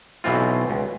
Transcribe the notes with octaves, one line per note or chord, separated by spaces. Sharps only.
B1 B2 E3 C4 F4
C#2